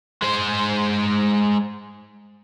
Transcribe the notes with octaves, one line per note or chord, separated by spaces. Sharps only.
G#3 C5